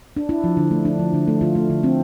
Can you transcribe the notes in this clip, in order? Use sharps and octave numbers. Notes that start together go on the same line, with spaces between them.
D4
D4 E4
F3
D3
A3
D4
F3
D3
A3
D3 F4
A3
D3
C4